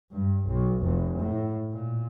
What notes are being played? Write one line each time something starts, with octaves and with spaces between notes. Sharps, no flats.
G2
B1
F1
A2
A#2